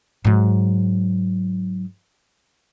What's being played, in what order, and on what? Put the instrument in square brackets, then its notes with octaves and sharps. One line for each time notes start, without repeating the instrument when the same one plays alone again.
[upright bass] G#2 F#3